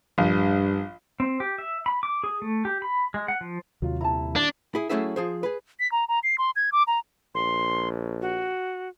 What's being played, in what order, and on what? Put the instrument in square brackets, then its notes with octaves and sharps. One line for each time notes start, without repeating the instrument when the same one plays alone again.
[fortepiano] A#1 [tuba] G2
[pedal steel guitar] C4
G4
E5
B5
D6
G#4
A3
G4
B5
G#3
F#5
F3
[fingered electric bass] D#2 C3 [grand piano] F#3 F4
[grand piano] D#1 E4 [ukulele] A5 A#5
[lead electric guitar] D4 [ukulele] D#4
[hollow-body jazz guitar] E4 G#4
F#3 A3 C#4 E4 G#4 E5
F3 G#4 C5
G#4 B4
[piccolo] B6
A#5
A#5
C7
C6
G#6
D6
A#5
[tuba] A#1 [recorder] C6
[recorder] F#4